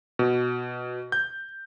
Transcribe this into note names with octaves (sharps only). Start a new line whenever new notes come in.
B2
G6